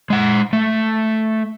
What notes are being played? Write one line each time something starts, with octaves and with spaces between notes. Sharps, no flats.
G#3 F#5
A3